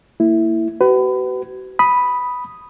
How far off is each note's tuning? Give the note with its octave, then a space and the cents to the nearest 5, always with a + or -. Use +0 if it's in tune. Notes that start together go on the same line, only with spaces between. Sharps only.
A#3 -35 E4 +0
F#4 +45 B4 +30
B5 +0 D#6 +0